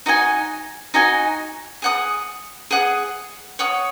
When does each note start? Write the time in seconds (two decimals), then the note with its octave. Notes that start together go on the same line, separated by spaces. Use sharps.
0.06 D#4 F#4 D#5 G#5
0.94 D#4 F#4 D#5 G#5
1.82 G#4 F#5 D#6
2.71 G#4 F#5 D#6
3.59 C#5 F#5 D#6